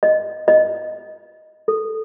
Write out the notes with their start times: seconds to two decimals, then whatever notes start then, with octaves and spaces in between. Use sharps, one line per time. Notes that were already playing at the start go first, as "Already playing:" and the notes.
0.03 D#5
0.48 D#5
1.68 A4